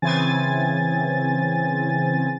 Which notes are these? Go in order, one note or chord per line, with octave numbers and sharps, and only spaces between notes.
C#3 E3 C4 G#5 A6